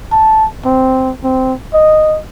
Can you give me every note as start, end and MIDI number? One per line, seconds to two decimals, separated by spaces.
0.12 0.47 81
0.65 1.12 60
1.24 1.54 60
1.74 2.18 75